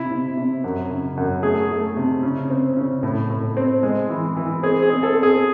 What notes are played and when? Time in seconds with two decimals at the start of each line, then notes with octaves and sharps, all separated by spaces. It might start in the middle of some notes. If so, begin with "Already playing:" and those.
Already playing: C3 E4
0.11 C3
0.37 C3
0.64 F#2
0.91 C#3
1.17 F#2
1.43 A3 G#4
1.71 A3
1.97 C3
2.23 C#3
2.50 C4
2.77 C#3
3.03 A2
3.30 A2
3.57 C4
3.83 G#3
4.10 E3
4.37 E3
4.63 C4 G#4
4.83 G#4
4.90 C4
5.03 A4
5.17 C4
5.23 G#4